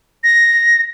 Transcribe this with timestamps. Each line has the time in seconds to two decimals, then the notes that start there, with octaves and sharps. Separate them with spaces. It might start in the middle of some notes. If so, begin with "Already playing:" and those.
0.24 A#6